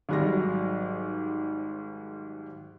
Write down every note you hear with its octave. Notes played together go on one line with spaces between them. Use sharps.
G#1 G#2 F#3 G3 C6 A#6